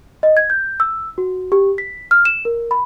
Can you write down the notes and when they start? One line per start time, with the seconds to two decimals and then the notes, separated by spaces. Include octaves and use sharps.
0.23 D#5
0.37 G#6
0.50 G6
0.80 E6
1.18 F#4
1.52 G4
1.78 B6
2.11 F6
2.25 E7
2.45 A#4
2.71 B5